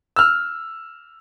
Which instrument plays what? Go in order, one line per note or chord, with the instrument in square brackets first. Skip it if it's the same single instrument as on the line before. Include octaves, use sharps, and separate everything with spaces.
[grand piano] E6 F6